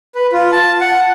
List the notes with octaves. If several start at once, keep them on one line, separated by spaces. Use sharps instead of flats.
B4
F4
A5
F#5